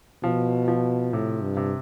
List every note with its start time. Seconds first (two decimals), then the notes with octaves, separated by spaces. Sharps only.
0.23 B2 F3
0.68 F3
1.13 A2 C3
1.43 G2
1.57 C3